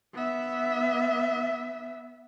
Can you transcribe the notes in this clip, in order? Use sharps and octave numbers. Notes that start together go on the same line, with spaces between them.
B3 E5